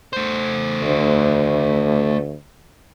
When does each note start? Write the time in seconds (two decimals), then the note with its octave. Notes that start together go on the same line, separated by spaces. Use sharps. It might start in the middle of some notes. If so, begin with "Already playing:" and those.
0.13 A3 C5
0.82 D2